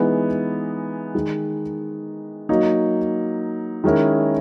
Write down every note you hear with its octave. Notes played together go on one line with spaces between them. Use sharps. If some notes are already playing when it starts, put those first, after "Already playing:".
Already playing: E3 G#3 B3 D#4
D#3 G#3 D#4
F#3 A#3 D#4
D#3 G#3 C#4 E4 A#4